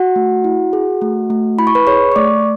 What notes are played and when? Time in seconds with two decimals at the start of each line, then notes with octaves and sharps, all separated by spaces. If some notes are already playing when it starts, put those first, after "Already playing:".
Already playing: F#4 F#5
0.16 A3
0.44 E4
0.73 G#4
1.01 A3
1.30 A3
1.58 E4 B5
1.67 C#6
1.75 B4 B5
1.87 G#4 C#5 C#6
2.12 C#6
2.16 A3 D5 D6